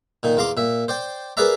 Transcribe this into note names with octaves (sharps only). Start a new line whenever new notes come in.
A#2 D#3 D#4
E2 F4 A#5 C6 D6
A#2 E5
C5 D5 G5
G#4 A#4 B4 D5 E5 A#5